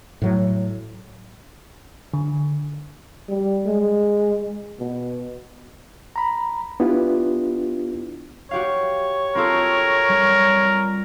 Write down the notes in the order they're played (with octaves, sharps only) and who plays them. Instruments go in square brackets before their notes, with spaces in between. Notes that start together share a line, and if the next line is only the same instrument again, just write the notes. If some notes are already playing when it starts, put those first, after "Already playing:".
[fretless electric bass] A2 F#3
[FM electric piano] D3
[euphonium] G3
G#3
B2
[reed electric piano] A#5 B5
B3 D4 E4 F4 G4
[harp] F#4 G4 F5 [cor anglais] C#5
[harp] C4 F4 A4 [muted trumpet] A#4
[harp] G3